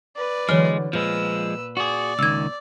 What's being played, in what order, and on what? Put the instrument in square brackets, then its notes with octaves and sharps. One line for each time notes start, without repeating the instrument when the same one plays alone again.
[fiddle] B4 D5
[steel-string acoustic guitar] D3 E3 F#3 [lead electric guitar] G#3 [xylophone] C#5 F6
[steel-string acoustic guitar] A#2 [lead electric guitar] F3 G#3 [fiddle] B4 E6
[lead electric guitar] F#4 G#4 [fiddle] D5
[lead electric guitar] C#2 D#3 [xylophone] E6 G#6